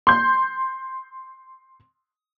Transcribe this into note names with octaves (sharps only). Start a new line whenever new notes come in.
C6 G6